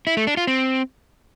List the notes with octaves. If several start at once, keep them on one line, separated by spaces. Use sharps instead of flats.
E4
A3
D4
F4
C4